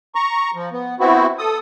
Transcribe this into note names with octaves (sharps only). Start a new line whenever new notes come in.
A#5 C#6
F3
B3
B3 C4 E4 F#4
A4 D#6